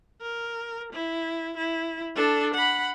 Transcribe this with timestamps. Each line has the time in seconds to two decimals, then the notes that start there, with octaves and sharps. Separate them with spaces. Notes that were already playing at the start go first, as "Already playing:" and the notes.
0.21 A#4
0.93 E4
1.57 E4
2.15 D4 A4
2.54 F#5 B5